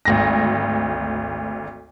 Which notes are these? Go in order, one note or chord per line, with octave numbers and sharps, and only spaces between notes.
G#1 D2 A#6